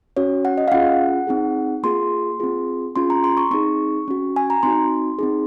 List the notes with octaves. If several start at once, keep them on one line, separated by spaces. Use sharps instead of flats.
C#4 F#4 C#5
F#5
D#5
F5
C#4 F4 G#4 F#5
C4 D#4 G#4
A#3 F4 G#4 C6
C4 F4 G#4
C#4 F4 G#4 C6
A#5
C6
C#6
C4 D#4 G#4 C#6
C#4 F#4
G#5
A#5
C4 D#4 F#4 C6
C4 D#4 G#4